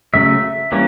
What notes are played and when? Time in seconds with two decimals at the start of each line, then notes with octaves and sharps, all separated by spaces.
0.14 C#3 F#3 A3 C#4 E5
0.72 E3 G3 A#3 C#4